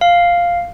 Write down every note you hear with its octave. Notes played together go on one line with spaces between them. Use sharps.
F5